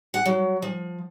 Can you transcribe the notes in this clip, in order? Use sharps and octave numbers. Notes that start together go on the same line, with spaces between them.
F#5
F#3
F3